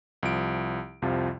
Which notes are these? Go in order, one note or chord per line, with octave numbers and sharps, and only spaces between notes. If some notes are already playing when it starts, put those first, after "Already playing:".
C2 F3 D7
C2 F2 C3 F3 F4